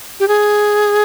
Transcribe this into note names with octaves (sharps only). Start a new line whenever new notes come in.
G4
G#4